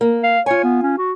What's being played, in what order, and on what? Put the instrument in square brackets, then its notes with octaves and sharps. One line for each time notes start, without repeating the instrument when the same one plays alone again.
[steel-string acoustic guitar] A#3
[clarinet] F5
[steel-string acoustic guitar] F4 G#5 [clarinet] C#5
[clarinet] B3
C#4
F#4